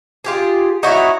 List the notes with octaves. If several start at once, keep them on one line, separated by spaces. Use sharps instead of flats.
F4 G4 G#4
D#4 E4 F#4 C#5